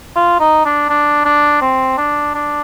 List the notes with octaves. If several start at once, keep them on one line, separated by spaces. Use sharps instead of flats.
F4
D#4
D4
D4
D4
C4
D4
D4